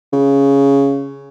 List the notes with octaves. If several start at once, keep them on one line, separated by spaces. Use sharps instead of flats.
C#3